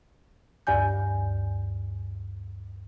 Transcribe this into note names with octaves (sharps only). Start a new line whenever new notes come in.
D2 G2 D5 G#5 G6